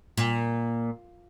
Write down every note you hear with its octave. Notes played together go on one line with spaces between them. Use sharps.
A#2